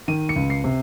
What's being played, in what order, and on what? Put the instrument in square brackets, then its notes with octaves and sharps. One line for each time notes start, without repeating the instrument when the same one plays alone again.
[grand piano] D#3 D#7
C#7
C#2
C7
C3